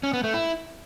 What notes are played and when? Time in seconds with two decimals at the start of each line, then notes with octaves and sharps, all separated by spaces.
0.03 C#4
0.14 B3
0.24 A3
0.34 E4